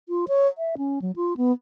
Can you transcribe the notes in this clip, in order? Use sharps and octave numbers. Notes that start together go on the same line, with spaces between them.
F4
C#5
E5
C#4
F#3
F4
B3